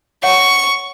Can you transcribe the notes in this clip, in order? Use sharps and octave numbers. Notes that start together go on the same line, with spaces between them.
C#5 E5 F#5 C#6